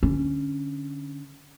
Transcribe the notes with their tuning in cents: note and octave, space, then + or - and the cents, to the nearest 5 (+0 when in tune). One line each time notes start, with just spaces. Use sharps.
D3 +0 C#4 +0